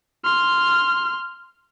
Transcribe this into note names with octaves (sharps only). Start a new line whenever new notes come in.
C6 F6